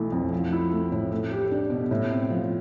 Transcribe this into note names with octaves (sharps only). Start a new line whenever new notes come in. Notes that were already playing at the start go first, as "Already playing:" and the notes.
Already playing: B1 E3 A3 E4
F2
F3
E4
A3
A2
A3
G4
D4
B2
A2
C4
F3